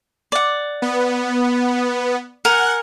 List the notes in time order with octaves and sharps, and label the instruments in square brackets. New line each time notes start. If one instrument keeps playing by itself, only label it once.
[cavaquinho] D5 F#5
[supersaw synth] B3
[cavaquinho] A#4 G#5 [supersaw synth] F#5